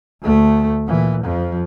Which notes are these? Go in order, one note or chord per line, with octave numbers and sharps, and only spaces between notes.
D2 A3
A#2 E3
F2 F3